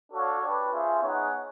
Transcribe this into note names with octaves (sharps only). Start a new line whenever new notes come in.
D4 F#4 A4 C#5 F5
D4 G4 B4
C#4 F4 G#4 C5 E5
B3 D#4 G#4 C#5 F#5